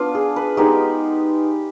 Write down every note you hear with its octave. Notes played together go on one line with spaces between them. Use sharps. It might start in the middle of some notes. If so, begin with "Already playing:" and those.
Already playing: B3 D4 F4
G#4
B4
G#3 B3 D#4 G4